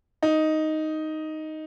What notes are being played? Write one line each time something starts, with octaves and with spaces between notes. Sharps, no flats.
D#4